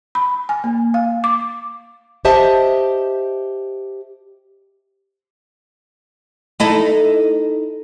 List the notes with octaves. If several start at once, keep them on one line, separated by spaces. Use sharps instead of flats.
B5
G#5
A#3
F5
D6
G4 C5 D#5 E5 A5
D#4 E4 A4